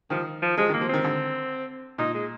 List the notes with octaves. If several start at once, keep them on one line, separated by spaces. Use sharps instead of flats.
D#3 F3
F3
F3 G#3
D#3 A#3
F3
D#3 C4
D3
A#2 D#4
G#3